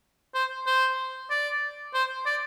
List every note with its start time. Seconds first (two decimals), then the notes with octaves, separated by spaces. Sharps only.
0.35 C5
0.66 C5
1.30 D5
1.94 C5
2.26 D5